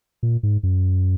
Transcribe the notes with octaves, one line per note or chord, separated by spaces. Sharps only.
A#2
G#2
F#2